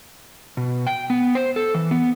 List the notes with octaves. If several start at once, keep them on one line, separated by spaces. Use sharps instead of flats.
B2
G5
B3
C5
A4
E3
B3